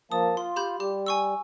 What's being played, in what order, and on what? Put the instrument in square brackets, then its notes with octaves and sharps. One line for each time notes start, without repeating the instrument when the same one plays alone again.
[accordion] F3 A#3 A5 [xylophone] D#6
[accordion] F4 [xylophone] C6
[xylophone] G4 B5 G6
[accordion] G3 [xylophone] G4
[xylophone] G#5 C#6 E6